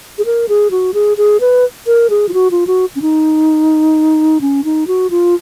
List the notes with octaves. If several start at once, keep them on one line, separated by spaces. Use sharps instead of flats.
G#4
A#4
G#4
F#4
G#4
G#4
B4
A#4
G#4
F4
F#4
F4
F#4
C#4
D#4
C#4
D#4
F#4
F4